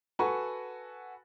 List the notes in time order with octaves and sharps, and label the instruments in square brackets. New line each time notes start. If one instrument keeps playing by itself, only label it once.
[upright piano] F#4 A4 B4 G#5 C#6